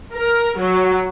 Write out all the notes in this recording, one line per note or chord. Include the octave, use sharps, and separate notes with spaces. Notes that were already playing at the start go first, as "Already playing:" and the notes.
A#4
F#3